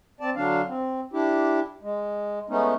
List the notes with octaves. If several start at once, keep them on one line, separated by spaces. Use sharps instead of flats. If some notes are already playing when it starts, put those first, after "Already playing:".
C4 D5 A5
D3 F#3 D4 F5
C4
D4 E4 G4
G#3
G#3 A3 B3 C#4 D#4